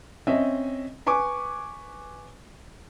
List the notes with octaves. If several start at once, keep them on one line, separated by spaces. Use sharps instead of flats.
C4 C#4 D#5 E5
B4 G#5 C#6 D6